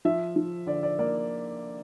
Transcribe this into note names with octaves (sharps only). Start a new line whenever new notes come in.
F3 E5
F3
D3 D5
D5
A#3 D5